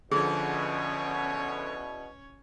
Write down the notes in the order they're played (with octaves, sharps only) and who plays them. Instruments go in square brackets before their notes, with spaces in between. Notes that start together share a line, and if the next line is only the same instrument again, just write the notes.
[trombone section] E2 B2 [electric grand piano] D3 F3 [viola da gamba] C#4 C#5 [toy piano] G#4